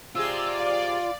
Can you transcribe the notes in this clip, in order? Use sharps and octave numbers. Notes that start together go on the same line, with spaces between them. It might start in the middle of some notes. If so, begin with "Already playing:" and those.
C3 G#3 F4 G#4 D5 E6
F5